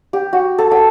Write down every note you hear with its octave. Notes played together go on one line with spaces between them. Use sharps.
G4
F#4
A4
G5